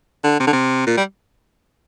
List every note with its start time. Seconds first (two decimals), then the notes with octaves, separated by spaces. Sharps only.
0.24 D3
0.40 C3
0.47 D3
0.53 C3
0.87 A#2
0.97 G3